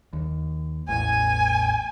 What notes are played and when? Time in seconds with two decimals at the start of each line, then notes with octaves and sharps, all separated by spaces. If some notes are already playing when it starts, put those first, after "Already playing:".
0.13 D#2
0.89 A1 E2 G#5